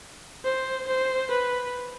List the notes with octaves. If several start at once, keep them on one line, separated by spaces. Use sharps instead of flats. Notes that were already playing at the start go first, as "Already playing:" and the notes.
C5
C5
B4